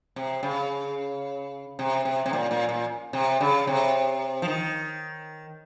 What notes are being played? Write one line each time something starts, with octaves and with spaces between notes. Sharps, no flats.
C3
C#3
C3
C3
C3
A#2
A#2
A#2
C3
C#3
C3
F3
D#3